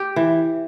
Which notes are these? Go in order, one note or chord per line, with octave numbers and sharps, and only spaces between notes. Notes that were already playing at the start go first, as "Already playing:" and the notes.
Already playing: G4
E3